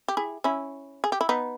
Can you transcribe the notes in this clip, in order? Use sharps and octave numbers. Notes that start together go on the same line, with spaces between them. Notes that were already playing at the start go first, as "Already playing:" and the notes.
G4
E4 G#4
C#4 E4
G#4
G4
E4
B3 D#4